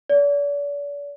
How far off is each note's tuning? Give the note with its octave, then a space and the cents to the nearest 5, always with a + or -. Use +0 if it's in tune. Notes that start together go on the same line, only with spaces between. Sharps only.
D5 -40